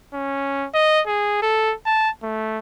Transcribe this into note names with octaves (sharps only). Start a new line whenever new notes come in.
C#4
D#5
G#4
A4
A5
A3